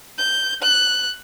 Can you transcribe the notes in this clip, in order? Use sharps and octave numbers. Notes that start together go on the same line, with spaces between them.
G6
F#6